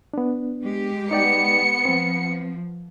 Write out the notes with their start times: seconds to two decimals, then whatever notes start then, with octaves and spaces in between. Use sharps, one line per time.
0.14 B3 D4
0.63 G#3 G4
1.11 B3 D#4 D5 G5 C#7
1.85 F3 C4